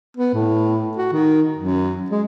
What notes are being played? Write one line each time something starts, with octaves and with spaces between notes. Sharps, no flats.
B3
A2
F#4
D#3
F#2
G#3